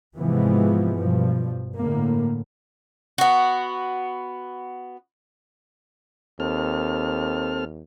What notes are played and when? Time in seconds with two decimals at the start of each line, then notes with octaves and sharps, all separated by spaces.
0.16 G#2 C3 E3 F3 G#3 B3
0.96 G2 B2 F3
1.77 A2 D3 A#3
3.18 B3 F#4
6.40 D#2 C4 A4 F6